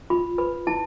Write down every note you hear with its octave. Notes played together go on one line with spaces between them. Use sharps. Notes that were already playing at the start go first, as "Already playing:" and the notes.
F4 B5
B4 B5
E4 A5